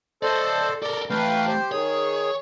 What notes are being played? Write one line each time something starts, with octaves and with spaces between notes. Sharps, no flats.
A4 C5 D5 D#5
A4 A#4 D5
E3 A3 B4 F5 G5
G4 C5
D#3 G#4 C#5